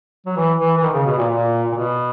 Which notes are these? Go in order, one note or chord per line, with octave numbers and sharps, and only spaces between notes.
F#3
E3
E3
E3
D#3
C#3
B2
A#2
A#2
A#2
B2